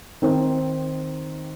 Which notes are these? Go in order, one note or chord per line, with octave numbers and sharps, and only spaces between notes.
D#3 C4 D#4